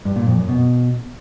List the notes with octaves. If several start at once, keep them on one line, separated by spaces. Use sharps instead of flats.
G2
A#2
F2
F#2
B2